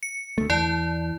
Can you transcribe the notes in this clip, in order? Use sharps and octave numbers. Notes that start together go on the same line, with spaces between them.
C#7
D2 A3
E2 E4 D5 A5